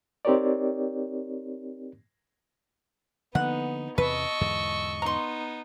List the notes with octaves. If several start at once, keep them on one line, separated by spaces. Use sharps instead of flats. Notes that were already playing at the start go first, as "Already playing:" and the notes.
C4 D#4 G4 A#4 C#5 D5
D3 F3 A#3 B3 D#4 F#5
E2 C3 E3 B4 D#5 A5 C#6 E6
E2 G#2 D3
B3 D#4 A#5 C6